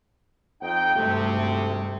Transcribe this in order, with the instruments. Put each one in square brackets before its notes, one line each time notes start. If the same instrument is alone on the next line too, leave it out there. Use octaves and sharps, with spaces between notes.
[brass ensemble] F2 D#4 G5
[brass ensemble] G#1 D2 C3 [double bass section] G2 G3 A3